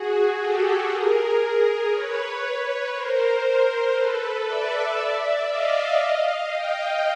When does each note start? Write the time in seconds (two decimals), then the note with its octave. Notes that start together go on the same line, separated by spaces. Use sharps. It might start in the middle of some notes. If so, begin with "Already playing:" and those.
Already playing: F#4 G#4
0.39 G4 A4
0.90 G#4 A#4
1.91 B4 C#5
2.93 A#4 C5
3.44 A#4 C5
3.95 A4 B4
4.46 D5 E5
5.48 D#5 F5
5.99 D#5 F5
6.50 F5 G5